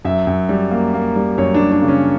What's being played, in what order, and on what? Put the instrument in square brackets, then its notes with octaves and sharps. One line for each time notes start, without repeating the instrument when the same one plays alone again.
[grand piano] F#2 E5
F#2
G3
A#3
A#3
G3
F#2 C#5
D4
G3
D4
C#3
C#4